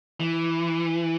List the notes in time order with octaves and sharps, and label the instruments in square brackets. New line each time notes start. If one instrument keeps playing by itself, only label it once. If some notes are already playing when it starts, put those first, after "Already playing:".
[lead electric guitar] E3